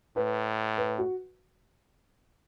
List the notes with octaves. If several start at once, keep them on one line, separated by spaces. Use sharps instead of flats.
A2 B4
B4
F#4